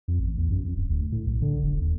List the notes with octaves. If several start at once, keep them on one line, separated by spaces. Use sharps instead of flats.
F2
A1
E2
F#2
F2
D1
D2
A2
B1
D3
E1
D#2